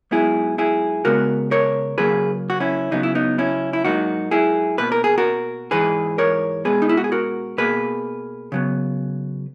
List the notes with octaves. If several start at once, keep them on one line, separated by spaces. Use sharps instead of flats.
G#2 F#3 B3 E4 G#4
E4 G#4
C#3 G#3 B3 F#4 A#4
A#4 C#5
C#3 F#3 A#3 G#4 B4
F#4
C#4 E4
C#3 F#3 B3 D#4
E4
B3 D#4
C#4 E4
E4
G#2 F#3 A#3 D#4 F#4
E4 G#4
B2 A#3 B4
A#4
G#4
F#4 A#4
G#2 E3 G#3 G#4 B4
A#4 C#5
B2 G#3 B3 G#4 B4
D#4
E4
F#4
G#4
F#4 A#4
B2 A#3 G#4 B4
C#3 F#3 B3